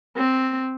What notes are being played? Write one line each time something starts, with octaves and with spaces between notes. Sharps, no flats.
C4